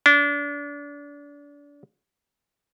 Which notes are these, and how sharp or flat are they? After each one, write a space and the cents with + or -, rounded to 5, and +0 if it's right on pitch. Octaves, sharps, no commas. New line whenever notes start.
D4 -30